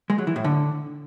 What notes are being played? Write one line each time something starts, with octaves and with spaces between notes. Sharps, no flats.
G#3
F#3
E3
A2
D3